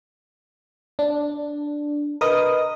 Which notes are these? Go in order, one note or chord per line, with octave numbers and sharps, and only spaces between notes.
D4
A#4 B4 D#5 D#6